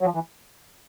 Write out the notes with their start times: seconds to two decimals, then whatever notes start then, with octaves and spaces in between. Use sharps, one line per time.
0.01 F#3
0.05 F3
0.15 E3